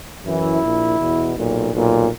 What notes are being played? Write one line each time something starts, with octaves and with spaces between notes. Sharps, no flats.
F#2 E3 E4
A#1 A#2
E2 B2
B1 A#2
B1 A#2